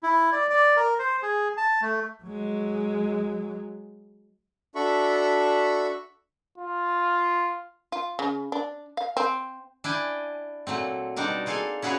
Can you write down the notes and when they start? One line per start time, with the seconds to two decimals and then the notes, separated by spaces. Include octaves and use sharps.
0.03 E4
0.32 D5
0.50 D5
0.77 A#4
0.99 C5
1.23 G#4
1.57 A5
1.82 A3
2.24 F#3 G#3
4.75 D4 F#4 A4 E5 B5 C#6
6.58 F4
7.92 F4
8.19 C#3
8.52 D4
8.97 F5
9.17 C4
9.84 D4 E4 G5 G#5
10.67 A#2 F#3 A3 C4
11.16 B2 G3 C4 D4 D#4 A#4
11.46 A#3 F4 G#4 A4 F5 G#5
11.82 C#4 E4 F#4 G#4 B4 C#5